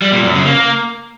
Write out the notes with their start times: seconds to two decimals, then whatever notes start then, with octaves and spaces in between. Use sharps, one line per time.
0.02 G3
0.13 A#2
0.23 F#2
0.34 C#3
0.45 A#3